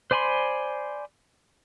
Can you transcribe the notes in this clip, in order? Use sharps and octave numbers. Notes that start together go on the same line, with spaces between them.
C5 D5 G#5 B5 C6